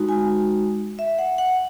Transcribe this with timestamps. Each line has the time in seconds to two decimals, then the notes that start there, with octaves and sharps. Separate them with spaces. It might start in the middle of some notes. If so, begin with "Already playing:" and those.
Already playing: G#3 D#4 F#4
0.09 G#5
0.99 E5
1.19 F#5
1.38 F#5